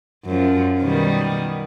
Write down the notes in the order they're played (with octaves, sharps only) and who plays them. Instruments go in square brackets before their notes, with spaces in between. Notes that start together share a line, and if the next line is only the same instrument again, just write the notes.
[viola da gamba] F#2 F3
B2 D#3 G3